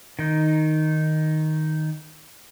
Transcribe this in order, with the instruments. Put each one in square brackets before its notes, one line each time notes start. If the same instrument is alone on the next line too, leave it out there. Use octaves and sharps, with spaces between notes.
[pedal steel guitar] D#3 D#4